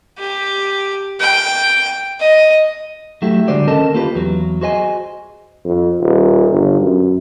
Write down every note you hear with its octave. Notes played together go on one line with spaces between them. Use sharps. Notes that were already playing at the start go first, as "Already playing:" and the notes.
G4
G5
D#5
F#3 A3 E4 G4
D3 G#3 D4 F#4 C5 D5
D#2 C#4 A4 A#4 D#5 A5
A#3 F4 G4 B4
E2 F#3
F#4 G#4 C5 D#5 F5 G#5
F2
D#1
G1
F#2